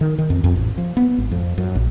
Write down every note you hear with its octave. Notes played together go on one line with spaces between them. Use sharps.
D#3
D#3
F2
F2
A1
F3
B3
G#1
F2
F#2
A#1